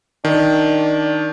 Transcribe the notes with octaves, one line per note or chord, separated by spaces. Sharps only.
D#3 D4